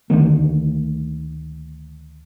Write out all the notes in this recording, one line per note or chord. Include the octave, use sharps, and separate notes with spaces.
D2 D3 D#3 A#3